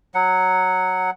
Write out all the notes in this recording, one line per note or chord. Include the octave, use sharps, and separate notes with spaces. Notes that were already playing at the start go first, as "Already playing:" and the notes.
F#3 F#5